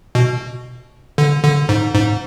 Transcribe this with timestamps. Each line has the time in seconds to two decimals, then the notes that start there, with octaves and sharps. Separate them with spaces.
0.15 B2
1.18 D3
1.44 D3
1.69 G#2
1.95 G#2